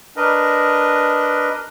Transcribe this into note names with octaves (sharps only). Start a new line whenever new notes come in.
D4 A#4 B4 D#5